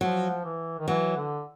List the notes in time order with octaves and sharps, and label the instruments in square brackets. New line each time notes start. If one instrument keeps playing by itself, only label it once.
[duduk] F3 [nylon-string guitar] F#3
[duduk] E3
D#3
[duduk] E3 [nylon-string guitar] F#3
[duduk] D3